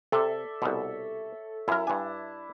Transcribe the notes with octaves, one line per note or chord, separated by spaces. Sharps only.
C3 A4 D5 E5
C2 B2 C#5
F#2 E4 A#4
G2 D4 G#5